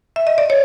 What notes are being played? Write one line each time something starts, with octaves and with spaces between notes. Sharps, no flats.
E5
D#5
D5
C#5